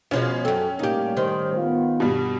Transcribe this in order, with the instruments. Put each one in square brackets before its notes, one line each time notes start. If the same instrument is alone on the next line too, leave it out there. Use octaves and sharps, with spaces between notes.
[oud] B2 F3 G#3 [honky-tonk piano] C#4
[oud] F#2 A4 [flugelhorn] G5
[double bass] A2 G3 [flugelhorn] A#3 [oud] D#4 G4
[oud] D#3 [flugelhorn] C5
[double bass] B3 [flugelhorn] F4
[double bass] G2 [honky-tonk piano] B2 G3